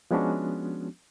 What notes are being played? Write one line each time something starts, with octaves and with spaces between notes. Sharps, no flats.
F3 G#3 B3 C#4 D4 F#4